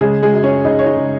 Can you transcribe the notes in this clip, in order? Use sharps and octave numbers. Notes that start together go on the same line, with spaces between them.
C#3 G#3 G#4
G#3 G#4
F#2
C#4 C#5
C#3 D#4 D#5
C#5
D#4 D#5
C#3